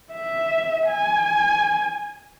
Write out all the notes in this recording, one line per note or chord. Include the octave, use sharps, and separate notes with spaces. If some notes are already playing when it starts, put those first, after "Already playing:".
E5
G#5